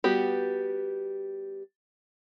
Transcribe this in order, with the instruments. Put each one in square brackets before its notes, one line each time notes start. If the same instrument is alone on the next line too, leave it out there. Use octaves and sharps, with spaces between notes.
[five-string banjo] G3 B3 F#4 G4